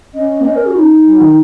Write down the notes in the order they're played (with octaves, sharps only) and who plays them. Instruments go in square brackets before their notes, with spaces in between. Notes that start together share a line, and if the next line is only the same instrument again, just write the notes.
[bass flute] C#4 [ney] D#5
[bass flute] A#3
[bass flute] C#4 [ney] D#5
[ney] A#4
F#4
D#4
[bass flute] F#3
D#3